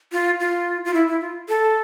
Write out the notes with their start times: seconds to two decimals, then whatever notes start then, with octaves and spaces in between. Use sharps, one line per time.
0.12 F4
0.40 F4
0.85 F4
0.94 E4
1.07 E4
1.21 F4
1.49 A4